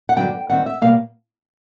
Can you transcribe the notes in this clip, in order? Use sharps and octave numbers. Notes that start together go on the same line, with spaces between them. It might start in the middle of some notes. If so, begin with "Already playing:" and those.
F#5
G2 D3 F#3 B3 G5
G2 D#3 G3 C4 F#5
E5
B2 G3 A#3 F5